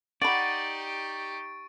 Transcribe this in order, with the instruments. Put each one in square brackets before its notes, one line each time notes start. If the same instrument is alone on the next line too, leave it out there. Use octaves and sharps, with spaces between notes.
[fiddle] D#4 G4 [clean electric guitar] D5 [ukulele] F#5 B5 [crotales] C#6 A6 D7